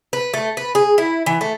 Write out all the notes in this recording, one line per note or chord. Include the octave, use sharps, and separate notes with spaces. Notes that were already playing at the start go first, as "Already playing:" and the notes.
B4
A3
B4
G#4
E4
E3
A3